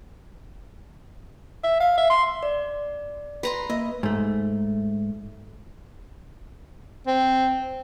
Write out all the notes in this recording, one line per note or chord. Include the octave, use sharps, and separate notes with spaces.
E5
F5
E5
C6
D5
B4 A#5 C6
A#3 D#5
G#2 A3
C4